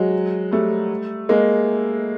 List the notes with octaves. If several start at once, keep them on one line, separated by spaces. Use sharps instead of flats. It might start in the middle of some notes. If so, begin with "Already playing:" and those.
Already playing: F#3 G#3
G3 A3
G#3 A#3